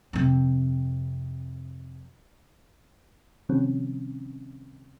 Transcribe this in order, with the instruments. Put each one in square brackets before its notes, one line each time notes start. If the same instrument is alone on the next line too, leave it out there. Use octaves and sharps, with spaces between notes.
[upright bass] F2 C3
[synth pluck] C3 D#3 F3 G3 C4 C#4